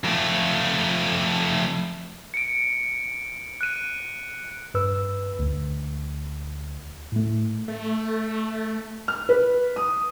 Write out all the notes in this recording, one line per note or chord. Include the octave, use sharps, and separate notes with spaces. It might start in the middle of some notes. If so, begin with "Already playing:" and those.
F2 A3
C#7 D7
F#6 D#7
G2 B4 E6
D2
A2 A3
A3
F6
B4
D#6